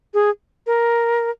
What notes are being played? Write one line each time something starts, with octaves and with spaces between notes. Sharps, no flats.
G#4
A#4